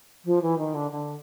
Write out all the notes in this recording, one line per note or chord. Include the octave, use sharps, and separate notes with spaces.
F3
E3
D#3
D3
D3